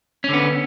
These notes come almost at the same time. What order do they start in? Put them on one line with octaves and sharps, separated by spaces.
C#4 D3 B3